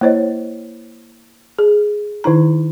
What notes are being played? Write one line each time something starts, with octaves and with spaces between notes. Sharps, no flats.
A#3 E4 C5 C#5 D#5
G#4
D#3 D#4 E4 A#5